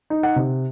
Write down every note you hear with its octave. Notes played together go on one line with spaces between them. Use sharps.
D#4
F#5
C3